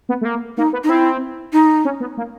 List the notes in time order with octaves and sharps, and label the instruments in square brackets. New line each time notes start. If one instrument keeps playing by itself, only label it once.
[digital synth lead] B3
A3
A#3
[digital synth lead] A#3 [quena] D#4
[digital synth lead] B3
[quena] D#4
[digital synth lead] C4 [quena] E4
[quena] D#4
[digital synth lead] C#4
B3
A#3